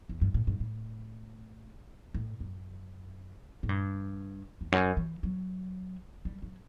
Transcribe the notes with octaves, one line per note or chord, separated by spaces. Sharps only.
E2
G2
A2
G2
A2
A2
F#2
A2
G2
E2
F#2
E3
F#3
G3
F#3